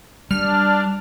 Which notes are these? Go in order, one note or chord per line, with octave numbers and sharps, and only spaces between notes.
G3 D4 F6